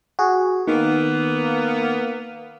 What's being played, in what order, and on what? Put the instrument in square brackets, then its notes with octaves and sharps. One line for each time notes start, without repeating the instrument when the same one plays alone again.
[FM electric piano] F#4 G#4
[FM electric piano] D#3 [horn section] A#3 B3